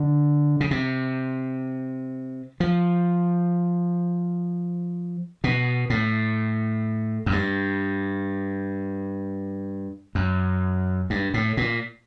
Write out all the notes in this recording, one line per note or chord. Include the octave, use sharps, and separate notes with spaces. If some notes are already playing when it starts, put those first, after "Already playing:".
Already playing: D3
C#3
C3
F3
B2
A2
F#2
G2
F#2
G2
A2
A#2